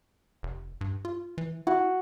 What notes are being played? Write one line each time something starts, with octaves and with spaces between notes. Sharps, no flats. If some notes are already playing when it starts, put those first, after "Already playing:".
F1
G2
F4
E3
E4 F#4